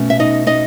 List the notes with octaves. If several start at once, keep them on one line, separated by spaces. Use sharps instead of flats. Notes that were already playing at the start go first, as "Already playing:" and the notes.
Already playing: B2 A3 C#4
E5
D#4 D#5
D#4 D#5